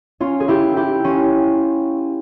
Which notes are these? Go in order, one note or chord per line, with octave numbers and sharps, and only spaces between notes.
C#4 F4
G#4
E4 G4
E4 G4
C#4 F4